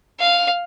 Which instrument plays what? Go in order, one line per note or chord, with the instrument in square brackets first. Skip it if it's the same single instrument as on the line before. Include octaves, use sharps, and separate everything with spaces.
[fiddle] F5